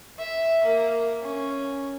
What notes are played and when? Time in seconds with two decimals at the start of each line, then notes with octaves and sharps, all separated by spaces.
0.18 E5
0.64 A#3
1.21 C#4